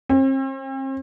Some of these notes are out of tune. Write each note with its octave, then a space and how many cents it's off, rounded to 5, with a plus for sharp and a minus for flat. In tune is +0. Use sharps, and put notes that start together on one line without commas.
C4 +40